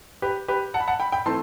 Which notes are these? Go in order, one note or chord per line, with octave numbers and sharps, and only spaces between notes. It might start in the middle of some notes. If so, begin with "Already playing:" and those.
G4 B4
G4 B4
F#5 A5
B5
F#5 A5
G5 B5
G5 B5
E3 A3 C4 A5 C6